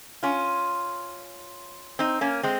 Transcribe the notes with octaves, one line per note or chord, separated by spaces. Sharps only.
C#4 F4
C4 D#4
A#3 C#4
G#3 C4